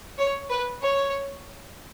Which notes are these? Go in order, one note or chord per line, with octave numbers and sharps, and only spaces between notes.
C#5
B4
C#5